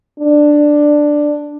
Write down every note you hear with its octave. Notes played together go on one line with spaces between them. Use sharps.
D4